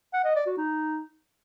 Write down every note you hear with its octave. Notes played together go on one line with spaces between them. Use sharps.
F#5
D#5
D5
F#4
D#4